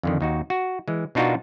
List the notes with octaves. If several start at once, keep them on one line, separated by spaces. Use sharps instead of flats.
F2 D3 D#3
D#2 D#4 F#4
F#4
E3 G#3
B2 D4 D#4 F4 F#4 A#4